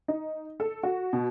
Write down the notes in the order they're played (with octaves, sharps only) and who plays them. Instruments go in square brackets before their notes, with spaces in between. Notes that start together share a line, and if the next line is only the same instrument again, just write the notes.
[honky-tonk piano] D#4
A4
F#4
B2